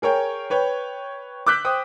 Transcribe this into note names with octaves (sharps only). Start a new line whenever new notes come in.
G#4 A#4 C#5 G5
B4 C#5 G5
D6 E6 F#6 G6 B6
C5 G5 D#6